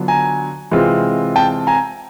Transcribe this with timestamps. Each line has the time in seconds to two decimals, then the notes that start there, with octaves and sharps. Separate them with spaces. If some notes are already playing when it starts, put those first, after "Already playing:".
Already playing: D3 F#3 B3 D4 F4
0.08 G#5 A#5
0.71 C3 E3 G#3 C4 F4
1.36 G5 A5
1.67 G#5 A#5